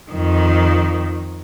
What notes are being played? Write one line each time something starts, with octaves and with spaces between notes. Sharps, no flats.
F2 D#3